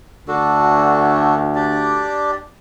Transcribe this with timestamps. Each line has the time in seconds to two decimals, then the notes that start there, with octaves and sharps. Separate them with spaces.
0.28 D2 D4 F#4 A4
1.55 D4 G4 D5